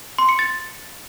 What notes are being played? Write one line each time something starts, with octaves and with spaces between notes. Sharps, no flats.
C6
C#7
A6